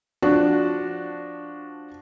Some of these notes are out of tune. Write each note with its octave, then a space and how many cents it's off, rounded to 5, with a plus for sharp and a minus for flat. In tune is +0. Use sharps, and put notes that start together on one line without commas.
F3 +0 D4 -5 F#4 +0